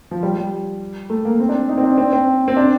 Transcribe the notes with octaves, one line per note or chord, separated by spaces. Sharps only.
F3
G3
G3
A3
A#3
C4
D4
D#4
C4
D4
C4
C4
C4
D4